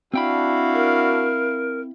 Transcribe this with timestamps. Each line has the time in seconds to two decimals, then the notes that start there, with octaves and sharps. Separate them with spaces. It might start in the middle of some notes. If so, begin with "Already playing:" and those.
0.14 C4 D4 E4 F#4 F5 G5 B5
0.73 A#4